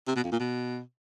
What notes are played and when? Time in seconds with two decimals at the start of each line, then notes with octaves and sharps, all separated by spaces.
0.08 C3
0.16 B2
0.24 F2
0.32 A#2
0.40 B2